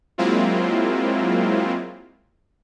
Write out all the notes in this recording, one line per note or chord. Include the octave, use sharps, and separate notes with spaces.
F#3 G#3 A#3 C4 E4 F4